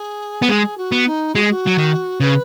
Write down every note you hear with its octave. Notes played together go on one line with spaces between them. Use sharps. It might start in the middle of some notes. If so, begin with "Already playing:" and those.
Already playing: G#4
B3
G#3 G#4
F#4
B3
D#4
G#3 F#4
G#4
F#4
F#3
D#3
C#3 B4